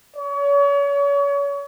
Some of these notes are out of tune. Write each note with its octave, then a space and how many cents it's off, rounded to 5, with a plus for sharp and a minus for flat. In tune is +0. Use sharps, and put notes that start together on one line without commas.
C#5 +35